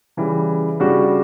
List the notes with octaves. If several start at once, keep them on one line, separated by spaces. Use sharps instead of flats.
C#3 E3 G3
C#3 G3 D4 F#4